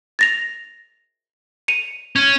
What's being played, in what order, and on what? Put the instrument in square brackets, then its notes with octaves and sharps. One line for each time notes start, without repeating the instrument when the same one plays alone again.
[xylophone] A6 A#6 F7
C#7 D#7 F7
[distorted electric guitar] C#4